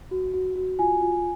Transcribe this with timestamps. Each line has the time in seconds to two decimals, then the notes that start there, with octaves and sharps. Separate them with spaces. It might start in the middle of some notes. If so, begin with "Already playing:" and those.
0.11 F#4
0.34 F#4
0.56 F#4
0.79 F4 G#5
1.01 F4